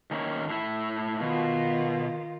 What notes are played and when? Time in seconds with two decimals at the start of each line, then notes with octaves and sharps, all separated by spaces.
0.11 D#3 A#3 C#4
0.49 A2 E4
1.20 B2 D#3 F4